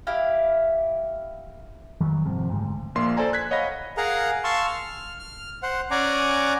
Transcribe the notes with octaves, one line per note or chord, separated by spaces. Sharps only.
E4 G4 F5
F2 D#3 F#3 G3
G#1 F2 C3
F#1 D2 G#2
A#1 A#3 C6
A4 C5 D5 G#5 A#5
F#6 G#6 B6
C#5 D#5 F5 F#5 B5 A#6
G#4 A#4 F5 F#5 A#5
F5 A5 C6 C#6 E6
F6
F6
C5 F#5
C#4 D5 F#5 G#5 A#5 D6